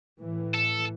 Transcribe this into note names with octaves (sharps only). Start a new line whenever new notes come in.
A2 E3
A4